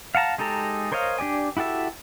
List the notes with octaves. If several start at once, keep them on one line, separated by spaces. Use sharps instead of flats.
F5 F#5 A5 A#5
G#3 D#4 G4 A4 A#5
A#4 C5 C#5 D#5 F5
D4 G4 D5 G#5
E4 F#4 G4 A4 E5